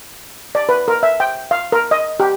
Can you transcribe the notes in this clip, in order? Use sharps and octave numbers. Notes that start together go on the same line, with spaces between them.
D5
B4
A#4
E5
G5
F5
A#4
D#5
G4